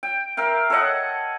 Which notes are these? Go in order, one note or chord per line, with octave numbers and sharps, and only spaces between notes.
G5
A#4 E5 F5 G5
A4 C#5 D#5 F#5